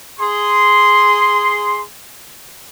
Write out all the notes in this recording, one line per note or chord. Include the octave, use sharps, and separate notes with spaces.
G#4 C6